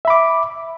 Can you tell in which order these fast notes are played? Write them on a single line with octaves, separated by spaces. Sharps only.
E5 B5 D6